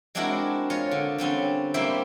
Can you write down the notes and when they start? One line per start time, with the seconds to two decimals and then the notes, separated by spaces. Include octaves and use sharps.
0.15 G#3 C4 D4 E4 F#4 A#4
0.70 F4 C#5 D#5
0.91 D3
1.18 D3 G3 C4 C#4
1.74 G3 A#3 C4 E4 C5 E5